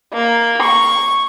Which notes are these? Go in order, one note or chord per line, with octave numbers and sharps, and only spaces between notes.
A#3
C#6